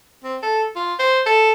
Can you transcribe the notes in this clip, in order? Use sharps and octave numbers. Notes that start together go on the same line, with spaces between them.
C4
A4
F4
C5
A4